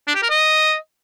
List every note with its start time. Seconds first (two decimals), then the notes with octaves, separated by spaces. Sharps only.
0.07 D4
0.15 G4
0.22 A#4
0.30 D#5